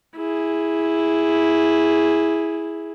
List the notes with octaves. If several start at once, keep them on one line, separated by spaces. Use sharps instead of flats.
E4 G#4